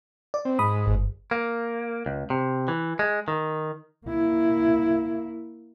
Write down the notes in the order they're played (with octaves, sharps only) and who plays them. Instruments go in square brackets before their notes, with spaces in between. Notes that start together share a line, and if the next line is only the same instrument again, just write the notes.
[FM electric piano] D5
[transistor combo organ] C4
[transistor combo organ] G#2 [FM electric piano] B5 D#6
[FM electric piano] G1
[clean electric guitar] A#3
C#2
C3
E3
G#3
D#3
[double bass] A#3 E4